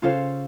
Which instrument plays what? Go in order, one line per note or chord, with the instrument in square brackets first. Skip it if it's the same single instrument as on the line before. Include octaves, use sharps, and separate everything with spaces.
[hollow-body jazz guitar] C#3 [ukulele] F4 A4 C5 F5